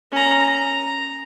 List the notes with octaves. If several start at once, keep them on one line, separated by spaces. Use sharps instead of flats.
C#4 A#5
A#5